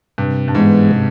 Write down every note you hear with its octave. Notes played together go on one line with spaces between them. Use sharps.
G2 C3
G2
G#2 E3 G#3 B3
C3